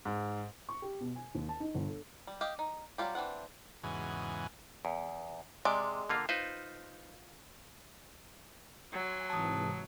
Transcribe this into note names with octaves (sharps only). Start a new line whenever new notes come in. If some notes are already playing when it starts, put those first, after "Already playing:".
G#2
C#6
G4
B2
G#5
D#2
A5
D#4
G1
A4
G3
G4 D#5 F5
D#4
F#3 G3 A3 F4 G4
E3 C4 D4 F#5
E2 G#2 C#3 E3 F#4 G#5
E2
C3 G#3 D5
D3 A#3 F4
D#4 F4 B4 C5
F#3 G#5 C6
G#2 C3 E3 A5 D#6